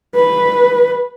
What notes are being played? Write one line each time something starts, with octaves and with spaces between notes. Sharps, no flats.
B4